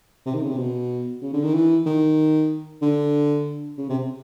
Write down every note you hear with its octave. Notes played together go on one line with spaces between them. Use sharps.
C3
D#3
C#3
C3
B2
C#3
D3
D#3
E3
D#3
D3
C#3
C3